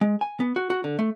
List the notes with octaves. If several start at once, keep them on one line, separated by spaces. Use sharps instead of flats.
G#3
G#5
B3
F#4
F#4
D3
A3